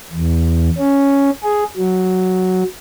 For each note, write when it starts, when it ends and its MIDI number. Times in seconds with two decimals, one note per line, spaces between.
0.13 0.69 40
0.78 1.30 61
1.43 1.63 68
1.77 2.63 54